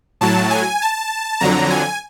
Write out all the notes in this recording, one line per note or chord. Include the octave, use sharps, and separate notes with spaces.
A2 F#3 A5
G#5
A5
F2 D3 F#3 A#5
G#5